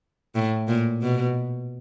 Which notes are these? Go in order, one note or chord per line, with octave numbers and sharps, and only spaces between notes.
A2
A#2
B2